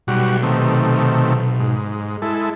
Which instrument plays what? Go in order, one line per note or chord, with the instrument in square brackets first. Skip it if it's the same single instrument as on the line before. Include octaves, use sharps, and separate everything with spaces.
[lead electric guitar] B1 [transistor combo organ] G3 F#4
[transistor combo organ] C3 D#3 A3
G#2
G#3 E4 A4